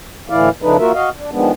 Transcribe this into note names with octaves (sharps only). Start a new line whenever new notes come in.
D2 A2 E3 E4 D5 F5
C#3 F3 A3 D4 D#4 B4
A#3 F4 F#4 A#4 E5
F#4 D#5 F5
D4
D#3 F3 G#3 B3 D4